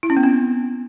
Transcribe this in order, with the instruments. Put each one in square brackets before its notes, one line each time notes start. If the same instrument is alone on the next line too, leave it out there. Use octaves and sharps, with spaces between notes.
[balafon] E4
C#4
B3
C4